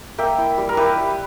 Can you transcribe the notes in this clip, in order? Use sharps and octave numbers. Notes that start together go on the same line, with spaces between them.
A#3 E5 G5
E4
G3
A#4
E4 G4 B4
G3